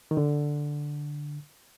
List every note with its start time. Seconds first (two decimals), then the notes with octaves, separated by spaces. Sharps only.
0.11 D#3
0.17 D3